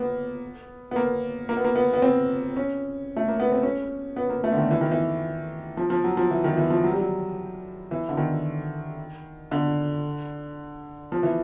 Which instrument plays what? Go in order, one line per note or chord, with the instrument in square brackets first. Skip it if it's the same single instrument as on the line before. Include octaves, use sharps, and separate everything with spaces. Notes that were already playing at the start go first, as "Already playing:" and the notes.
Already playing: [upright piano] A#3 B3
B3
A#3
A#3
B3
A#3
B3
B3
C4
C#4
A3
A#3
B3
C4
C#4
B3
A#3
A3
D3
D#3
E3
D#3
E3
F3
F3
F#3
F3
E3
D#3
E3
F3
F#3
G3
F#3
E3
D3
D#3
D3
F3
E3